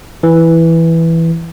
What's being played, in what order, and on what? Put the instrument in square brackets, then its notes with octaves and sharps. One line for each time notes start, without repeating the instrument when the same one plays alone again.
[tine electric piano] E3